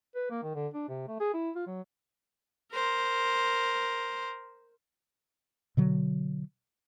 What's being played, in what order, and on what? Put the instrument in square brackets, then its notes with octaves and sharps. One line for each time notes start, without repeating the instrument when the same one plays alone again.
[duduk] B4
A#3
D#3
D3
D4
C3
A3
G#4
E4
F4
F#3
[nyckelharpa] A#4 C5
[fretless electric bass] B2 D3 F#3